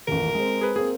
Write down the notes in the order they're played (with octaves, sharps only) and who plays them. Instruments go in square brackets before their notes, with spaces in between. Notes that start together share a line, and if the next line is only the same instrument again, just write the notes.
[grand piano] D#1 A1 [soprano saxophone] A#4
[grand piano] G#3 C4
[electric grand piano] G#4 B4
[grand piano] A#3 C4 [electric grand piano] G#4